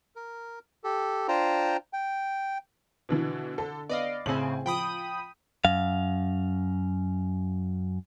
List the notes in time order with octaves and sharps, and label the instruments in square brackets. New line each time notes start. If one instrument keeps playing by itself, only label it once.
[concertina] A#4
G4 A4
D4 F4 C5 G5 A#5
G5
[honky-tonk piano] B2 D3 E3
[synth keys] D3 [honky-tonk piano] A4
[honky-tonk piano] B3 [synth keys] D5 D#5 F5
[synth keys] A2 C#3 C4 [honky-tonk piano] G#5 F#7
[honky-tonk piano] F3 [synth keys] G5 B5 D#6
[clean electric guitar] F#2 F5